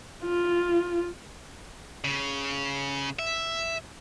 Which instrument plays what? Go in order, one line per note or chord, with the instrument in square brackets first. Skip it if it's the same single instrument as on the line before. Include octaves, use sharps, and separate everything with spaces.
[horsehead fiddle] F4
[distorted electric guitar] C#3
E5